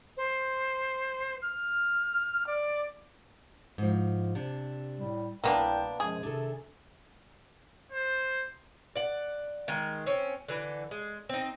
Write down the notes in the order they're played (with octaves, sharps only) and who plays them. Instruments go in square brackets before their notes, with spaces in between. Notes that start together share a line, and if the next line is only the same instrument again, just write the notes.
[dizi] C5
F6
D5
[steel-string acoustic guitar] G#2 F3
C3 D4
[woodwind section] A2 G3
[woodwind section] C2 G5 [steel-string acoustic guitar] B2 A5 [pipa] A#3 B3 D4
[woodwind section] F#2 F3 G#3 [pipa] G#4
[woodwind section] C3 D#3 [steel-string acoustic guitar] D4 A4
[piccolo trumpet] C5
[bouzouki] D5 F#5
D#3 G#3
C4 C#4
D3 E3
G#3
C4 D#4